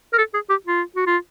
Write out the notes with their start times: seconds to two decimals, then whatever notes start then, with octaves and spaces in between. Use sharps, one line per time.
0.13 A#4
0.18 A4
0.34 G#4
0.50 G4
0.67 F4
0.96 F#4
1.07 F4